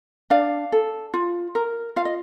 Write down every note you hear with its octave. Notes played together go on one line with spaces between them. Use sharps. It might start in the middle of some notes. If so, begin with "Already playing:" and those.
D4 D5 F5
A4
F4
A#4
F4 F5
D#5